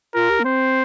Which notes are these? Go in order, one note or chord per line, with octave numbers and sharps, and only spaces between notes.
F4 A#4
G4
A#3
C4 C5